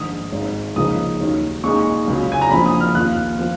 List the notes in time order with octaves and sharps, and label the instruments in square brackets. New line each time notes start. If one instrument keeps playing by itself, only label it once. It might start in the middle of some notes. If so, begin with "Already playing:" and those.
Already playing: [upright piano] A#1 G#2 D#3 D#6
G#1 G#2 D#3 G#3 D#4
C#2 C#3 F3 A#3 D#4 D#6
D#2 D#3 F#3 C#4
A#2 G#3 D#4 C#6
C#2 C#3 F#3
G#5
A#5
A#1 A#2 F3 B5
D#6
F6
D#2 D#3 A#3 F4 F#6
F3 B3 F4